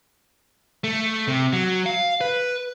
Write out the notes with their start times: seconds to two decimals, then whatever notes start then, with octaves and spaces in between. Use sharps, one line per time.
0.84 A3
1.27 C3
1.53 F#3
1.86 F5
2.21 B4